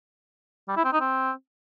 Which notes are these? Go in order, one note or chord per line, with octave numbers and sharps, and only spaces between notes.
G3
E4
C4
D#4
C4